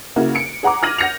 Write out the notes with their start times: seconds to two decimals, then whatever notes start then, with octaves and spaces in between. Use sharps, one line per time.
0.16 C#3 A#3 E4 F#4
0.35 C#7 D7
0.63 G#4 F#5 A#5 D6
0.83 F6 G#6 A#6 D#7 F#7
0.98 F#5 G6 A#6 C#7 F7